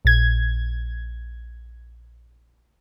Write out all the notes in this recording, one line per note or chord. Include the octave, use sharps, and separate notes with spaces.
A#1 G#6